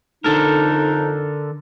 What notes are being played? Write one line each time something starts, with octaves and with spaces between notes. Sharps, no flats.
F2 D3 D4 D#4 A4 A#4